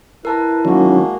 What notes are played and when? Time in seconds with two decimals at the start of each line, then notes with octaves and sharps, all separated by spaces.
0.25 E4 A#4 B4 A5 A#5
0.65 D#3 F#3 G#3 A#3 C#4 F#4